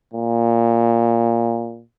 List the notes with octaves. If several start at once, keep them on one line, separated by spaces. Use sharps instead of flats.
A#2